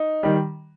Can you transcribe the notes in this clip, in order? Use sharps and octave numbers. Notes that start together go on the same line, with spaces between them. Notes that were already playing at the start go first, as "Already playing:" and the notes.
Already playing: D#4
D#3 G3